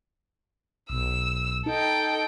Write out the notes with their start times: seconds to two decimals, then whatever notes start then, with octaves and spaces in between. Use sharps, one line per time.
0.90 B1 E6
1.66 D#4 A4 G5